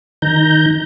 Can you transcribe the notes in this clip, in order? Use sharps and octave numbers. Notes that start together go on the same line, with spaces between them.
D#3 A#5 G6